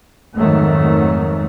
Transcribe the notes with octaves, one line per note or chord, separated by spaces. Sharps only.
F2 G#2 D#3 F#3 A3